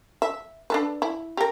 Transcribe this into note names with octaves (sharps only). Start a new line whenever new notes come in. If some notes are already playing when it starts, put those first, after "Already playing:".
E5
D4 A4 B4
E4
G4 A#4